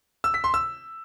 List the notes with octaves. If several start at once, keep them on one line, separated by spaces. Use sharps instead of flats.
E6
B6
C6
E6